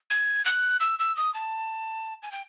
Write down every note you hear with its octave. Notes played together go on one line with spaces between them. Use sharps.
G#6
F#6
E6
E6
D#6
A5
G#5
G5